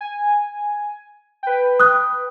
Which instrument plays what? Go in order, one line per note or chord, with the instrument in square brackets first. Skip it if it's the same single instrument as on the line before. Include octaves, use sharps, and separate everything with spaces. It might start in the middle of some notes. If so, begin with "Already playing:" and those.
[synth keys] G#5
B4 G5
[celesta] D#6 F#6